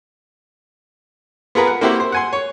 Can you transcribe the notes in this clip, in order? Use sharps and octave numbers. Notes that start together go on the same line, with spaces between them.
B3 F4 G#4 A#4 B4
F#5
A#3 C4 E4 F#4 G4 C5
C5
F#5 G#5 C6
C#5